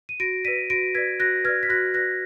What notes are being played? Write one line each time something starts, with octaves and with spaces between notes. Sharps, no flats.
D#7
F#4 A#6 D7
B4 D5 B6 D#7
F#4 A#6 D7
B4 D5 G#6 B6
F#4 F#6 A#6
B4 D5 F6 G#6
B6
F#4 F#6 A#6
B4 D5 F#6 A#6